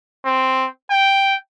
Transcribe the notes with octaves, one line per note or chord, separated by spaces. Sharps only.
C4
G5